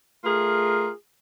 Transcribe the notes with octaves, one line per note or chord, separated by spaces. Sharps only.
A3 F4 G#4 A#4